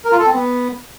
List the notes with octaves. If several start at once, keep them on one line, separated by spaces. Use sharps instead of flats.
A#4
F4
A4
C4
B3